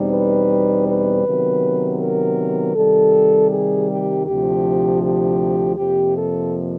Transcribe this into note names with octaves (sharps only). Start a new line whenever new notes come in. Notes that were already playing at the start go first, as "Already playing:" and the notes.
Already playing: E2 B2 G3 C4 D#4
B4
B4
C3 D#3 F#3 B3
A#4
C3 D#3 G3 A4
G#4
G4
D2 C3 F3 G4
G4
F2 C3 F3 A#3 G4
A4